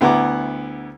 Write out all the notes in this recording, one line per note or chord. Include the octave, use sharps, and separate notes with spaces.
D2 B3 E4 F#5 A#5 D6